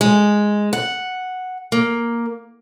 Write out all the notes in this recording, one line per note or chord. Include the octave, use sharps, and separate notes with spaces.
G#3
F#5
A#3